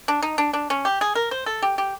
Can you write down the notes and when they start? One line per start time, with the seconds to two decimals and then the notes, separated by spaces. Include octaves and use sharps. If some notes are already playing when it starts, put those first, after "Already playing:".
0.08 D4
0.22 D#4
0.38 D4
0.53 D4
0.70 C#4
0.85 G4
1.01 G#4
1.15 A#4
1.31 C5
1.46 A4
1.62 G4
1.78 G4